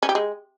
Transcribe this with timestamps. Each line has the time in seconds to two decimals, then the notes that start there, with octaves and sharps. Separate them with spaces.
0.03 C#4
0.09 G4
0.15 G#3